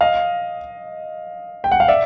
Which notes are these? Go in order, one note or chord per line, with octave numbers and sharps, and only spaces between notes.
D#5 F5
G5
F#5
F5
D5 E5